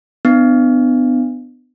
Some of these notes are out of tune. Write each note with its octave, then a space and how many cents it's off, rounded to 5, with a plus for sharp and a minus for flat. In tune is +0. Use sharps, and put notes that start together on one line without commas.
B3 +25 D4 +30